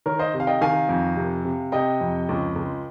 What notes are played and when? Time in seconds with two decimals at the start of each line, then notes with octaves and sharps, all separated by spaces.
0.06 D#3 A#4 C#5
0.19 C5 D#5
0.34 C3
0.40 F5
0.47 D#5 G5
0.61 D#3 F5 G#5
0.89 F2
1.16 C3
1.45 C3
1.72 C3 D#5 G5
2.01 F2
2.29 C#2
2.56 C#2